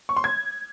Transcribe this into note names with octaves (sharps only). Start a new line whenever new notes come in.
C#6
C6
G#6